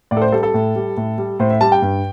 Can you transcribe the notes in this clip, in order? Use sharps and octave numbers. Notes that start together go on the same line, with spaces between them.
A2 D5
A4
C5
G3 A4
A4
A2
G3
A2
G3
A2 C5
E5
G3 A5
G5
G2